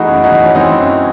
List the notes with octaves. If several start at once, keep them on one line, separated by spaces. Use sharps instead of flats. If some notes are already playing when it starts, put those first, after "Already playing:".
Already playing: E3 A3 D#4 E4 F#4 G#4
F#2
D#4 F#4
E3
C#4
E3 C4 D#4
F#2